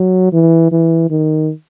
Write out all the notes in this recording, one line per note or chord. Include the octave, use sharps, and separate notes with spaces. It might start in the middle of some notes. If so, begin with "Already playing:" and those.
Already playing: F#3
E3
E3
D#3